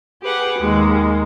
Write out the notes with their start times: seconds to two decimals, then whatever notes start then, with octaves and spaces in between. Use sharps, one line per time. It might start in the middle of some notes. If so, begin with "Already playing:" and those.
0.23 G4 G#4 B4 F#5
0.58 D#2 G#3